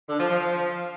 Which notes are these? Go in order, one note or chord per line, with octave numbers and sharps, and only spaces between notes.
D3
F3
F3